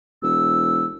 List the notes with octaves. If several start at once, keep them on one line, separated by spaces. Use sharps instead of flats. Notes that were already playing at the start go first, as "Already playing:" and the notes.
E1 E6